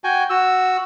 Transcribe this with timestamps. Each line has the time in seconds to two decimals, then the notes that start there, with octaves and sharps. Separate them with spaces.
0.04 F#4 G5 G#5
0.30 F#4 E6